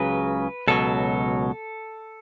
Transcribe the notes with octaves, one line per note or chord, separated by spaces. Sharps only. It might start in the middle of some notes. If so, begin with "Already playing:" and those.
Already playing: C#2 C#3 F#3 B4
C#2 B2 F#3 A4